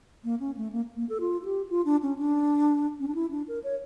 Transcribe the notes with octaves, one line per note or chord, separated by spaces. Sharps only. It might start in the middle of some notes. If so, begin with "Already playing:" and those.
A#3
C#4
A3
A#3
A#3
A4
F4
F4
G4
F4
D4
C#4
D4
C#4
D4
E4
D4
A#4
C#5